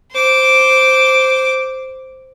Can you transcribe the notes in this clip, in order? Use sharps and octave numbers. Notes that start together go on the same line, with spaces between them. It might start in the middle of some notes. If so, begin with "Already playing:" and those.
C5 D6